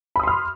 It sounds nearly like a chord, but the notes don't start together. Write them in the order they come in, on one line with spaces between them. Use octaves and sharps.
B5 D#6 C6 F6